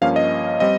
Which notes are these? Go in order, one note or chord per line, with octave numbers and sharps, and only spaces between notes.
G2 F3 A#3 C#4 F5
D#5
G3 C4 D#5